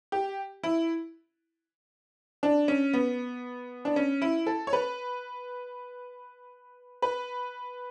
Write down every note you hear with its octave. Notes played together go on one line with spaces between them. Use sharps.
G4
E4
D4
C#4
B3
D4
C#4
E4
A4
C#5
B4
B4